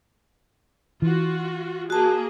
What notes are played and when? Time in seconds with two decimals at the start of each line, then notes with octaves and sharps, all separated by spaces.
1.02 E3 F4 F#4
1.90 A#3 F#4 G#4 A5